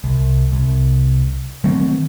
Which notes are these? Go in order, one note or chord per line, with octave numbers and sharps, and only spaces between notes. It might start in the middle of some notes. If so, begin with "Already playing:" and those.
C2
C2
D#3 F#3 A3 C4